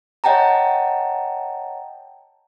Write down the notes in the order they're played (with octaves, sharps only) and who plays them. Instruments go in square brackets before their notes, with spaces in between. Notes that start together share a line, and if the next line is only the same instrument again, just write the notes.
[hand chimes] C#5 D#5 F#5 G5 A5 A#5